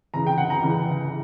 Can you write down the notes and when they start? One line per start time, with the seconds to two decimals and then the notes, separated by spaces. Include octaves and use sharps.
0.14 C#3 E3 A#5
0.27 G5
0.38 F#5
0.50 A#5
0.62 C#3 E3